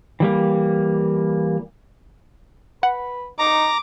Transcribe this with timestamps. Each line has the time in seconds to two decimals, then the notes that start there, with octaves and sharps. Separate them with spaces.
0.20 E3 G3 A#3
2.83 B4 F#5
3.39 D#4 A#5 D6